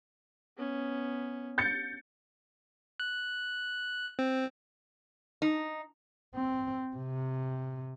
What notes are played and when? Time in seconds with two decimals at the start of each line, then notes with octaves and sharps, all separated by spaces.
0.57 B3 C#4
1.58 G6 A6 C#7
3.00 F#6
4.19 C4
5.42 D#4
6.35 C4
6.96 C3